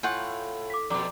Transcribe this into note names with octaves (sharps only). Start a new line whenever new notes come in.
A2 F4 F#5 G#5 C#6 G6
D6 B6
F2 B2 G4 D5 A#5 D6